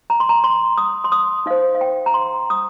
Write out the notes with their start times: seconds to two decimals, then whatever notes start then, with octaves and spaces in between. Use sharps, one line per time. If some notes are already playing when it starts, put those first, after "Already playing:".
0.10 A#5
0.20 C6
0.29 A#5
0.44 C6
0.77 D#6
1.04 C6
1.12 D#6
1.46 D#4 C5 F5
1.75 F5
1.81 G5
2.06 A#5
2.14 C6
2.50 D#6